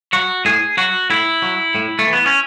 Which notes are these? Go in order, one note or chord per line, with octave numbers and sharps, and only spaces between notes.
F#3 F#4
A2 G#4
F#3 F#4
A2 E4
F#3
A2
A3
E3
B3
C#4